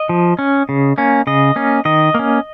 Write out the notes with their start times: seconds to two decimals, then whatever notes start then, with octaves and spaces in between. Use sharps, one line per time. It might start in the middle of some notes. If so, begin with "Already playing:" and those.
Already playing: D#5
0.09 F3
0.39 C#4
0.69 C#3
0.98 A#3 C#4
1.27 C#3 D#5
1.56 A#3 C#4
1.85 D#3 D#5
2.14 A#3 C#4